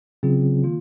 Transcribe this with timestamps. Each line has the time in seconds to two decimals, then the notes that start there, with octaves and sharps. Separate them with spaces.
0.23 C#3 F#3 C4 F4 G#4
0.64 D#3 A#3 F4